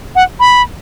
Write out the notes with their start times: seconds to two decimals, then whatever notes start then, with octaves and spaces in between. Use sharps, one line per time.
0.15 F#5
0.40 B5